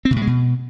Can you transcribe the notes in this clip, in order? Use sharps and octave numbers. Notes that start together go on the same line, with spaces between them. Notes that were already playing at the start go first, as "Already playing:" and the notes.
C4
C#3
A2
G#3
B2